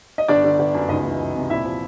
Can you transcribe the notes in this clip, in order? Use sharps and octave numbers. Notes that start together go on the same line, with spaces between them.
D#5
G1 D4 D5
D3
G1
F#2
C#2 D#4 D#5
E3
C#2
C3
A#1 E4 E5
F3